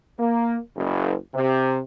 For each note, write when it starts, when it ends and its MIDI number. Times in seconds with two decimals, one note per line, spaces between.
0.19 0.57 58
0.76 1.14 30
1.34 1.80 48